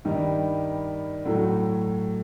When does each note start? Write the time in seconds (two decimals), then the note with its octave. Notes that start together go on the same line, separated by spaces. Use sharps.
0.05 G2 D#3 G3
1.25 A2 F#3 A3